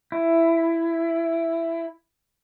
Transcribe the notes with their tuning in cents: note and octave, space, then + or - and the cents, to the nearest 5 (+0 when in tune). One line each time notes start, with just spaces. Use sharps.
E4 +10